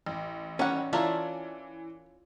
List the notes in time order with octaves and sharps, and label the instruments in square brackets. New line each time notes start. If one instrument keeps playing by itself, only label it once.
[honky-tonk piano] A1
[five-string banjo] D#3 G3 F#5 [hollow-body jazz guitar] C#4
[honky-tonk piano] E3 [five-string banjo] D4 A#4 C#5 [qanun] F4 D5 E5